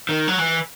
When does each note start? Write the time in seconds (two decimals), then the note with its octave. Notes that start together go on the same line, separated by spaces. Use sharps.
0.09 D#3
0.28 F#3
0.38 E3